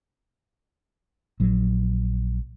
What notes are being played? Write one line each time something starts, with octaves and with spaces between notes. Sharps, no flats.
A#1 F#3